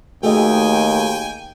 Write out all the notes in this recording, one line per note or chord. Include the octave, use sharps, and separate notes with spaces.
D#2 A3 F#4 G#4 D#5 G5 G#5